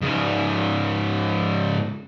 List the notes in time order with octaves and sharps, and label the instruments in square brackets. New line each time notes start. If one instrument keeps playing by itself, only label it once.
[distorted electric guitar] G#2 C#3